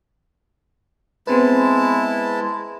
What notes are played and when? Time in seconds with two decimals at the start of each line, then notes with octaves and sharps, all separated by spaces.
1.27 G#3 B3 C4 E4 B4 A5